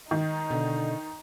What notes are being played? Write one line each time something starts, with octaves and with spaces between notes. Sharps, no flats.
D#3 D#4
B2 D3